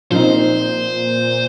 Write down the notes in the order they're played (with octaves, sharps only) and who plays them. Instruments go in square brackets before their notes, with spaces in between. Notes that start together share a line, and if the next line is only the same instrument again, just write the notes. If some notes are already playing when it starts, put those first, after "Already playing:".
[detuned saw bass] A#2 [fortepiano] F3 C4 D#4 [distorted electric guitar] C5